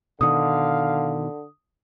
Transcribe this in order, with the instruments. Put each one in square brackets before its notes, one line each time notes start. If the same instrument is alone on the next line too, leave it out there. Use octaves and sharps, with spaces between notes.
[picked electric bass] B2 D#3 [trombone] D3 [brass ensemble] F5 [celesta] D#6